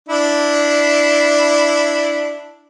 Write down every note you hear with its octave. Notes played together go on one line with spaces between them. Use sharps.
D4 E4